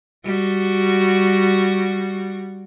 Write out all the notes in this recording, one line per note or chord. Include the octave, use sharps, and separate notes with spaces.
G3 F#4